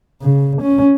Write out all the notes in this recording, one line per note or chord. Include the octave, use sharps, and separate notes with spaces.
C#3
C#4